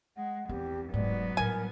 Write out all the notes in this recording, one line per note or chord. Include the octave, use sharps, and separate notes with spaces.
G#3 F#5
E2 C4 G4
F1 G#2 F#3 B3 D5
A2 G3 A#4 G#5